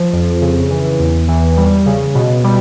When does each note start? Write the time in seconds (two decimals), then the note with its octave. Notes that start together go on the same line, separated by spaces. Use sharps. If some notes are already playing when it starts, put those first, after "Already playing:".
Already playing: F3
0.13 F2
0.42 C#3
0.71 E3
1.00 E2
1.28 E3
1.57 G3
1.86 C#3
2.15 B2
2.44 G3